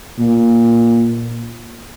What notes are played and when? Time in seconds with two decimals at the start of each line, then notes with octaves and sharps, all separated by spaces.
0.19 A#2